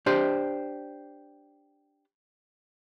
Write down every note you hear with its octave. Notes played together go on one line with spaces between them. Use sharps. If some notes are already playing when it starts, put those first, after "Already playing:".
D4 G4 C5